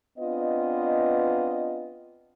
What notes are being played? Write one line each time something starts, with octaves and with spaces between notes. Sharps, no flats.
B3 C4 D4 F4 B4 D#5